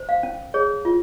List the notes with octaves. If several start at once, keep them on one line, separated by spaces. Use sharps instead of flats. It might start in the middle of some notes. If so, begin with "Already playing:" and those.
Already playing: C5
F5
C#4
G#4 C#5
F4